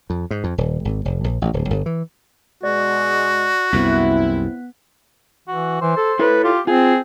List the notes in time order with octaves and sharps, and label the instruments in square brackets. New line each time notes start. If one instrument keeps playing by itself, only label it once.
[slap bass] F2
G#2
F2
D#1
G#1
F1
A#1
A1
D1
G1
E3
[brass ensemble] B2 G#3 [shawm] F#4 [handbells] D5
[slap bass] C2 F#2 [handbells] B3 F#6 B6 [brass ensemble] C4 E4
[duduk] E3 [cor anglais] F#4
[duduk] E3 [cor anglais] C5
[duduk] A4
[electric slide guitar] E4 A4 C#5 [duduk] B4
[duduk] F4 [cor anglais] G4
[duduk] C4 [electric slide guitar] F4 [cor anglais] G#4